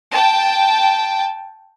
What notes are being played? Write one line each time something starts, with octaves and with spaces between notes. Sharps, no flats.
G5 A5